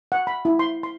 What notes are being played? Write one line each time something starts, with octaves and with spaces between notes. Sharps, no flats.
F#5
B5
E4
C6
C6